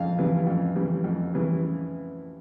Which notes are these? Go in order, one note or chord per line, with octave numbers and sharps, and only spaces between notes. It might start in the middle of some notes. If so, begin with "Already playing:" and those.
Already playing: F2 C#3 F5
C#3 E3 G3
F2
C#3 E3 G3
F2
C#3 E3 G3